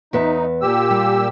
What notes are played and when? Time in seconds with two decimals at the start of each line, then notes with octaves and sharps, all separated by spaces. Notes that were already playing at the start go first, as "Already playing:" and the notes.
0.13 E2 D#4 B4 E5
0.62 A#2 G4 E6
0.91 G3